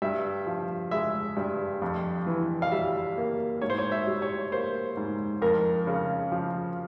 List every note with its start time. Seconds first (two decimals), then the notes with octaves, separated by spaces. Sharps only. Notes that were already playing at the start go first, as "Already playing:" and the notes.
0.02 G2 E5
0.47 F3
0.91 G#3 E5
1.37 G2
1.82 F2
2.27 E3
2.62 F5
2.72 G3 E5
3.17 A#3
3.62 G#2 C#5
3.70 C5
3.78 C#5
3.92 E5
4.07 G3
4.22 C#5
4.52 A#3 C5
4.97 G#2
5.42 F2 A#4
5.87 C#3
6.32 F3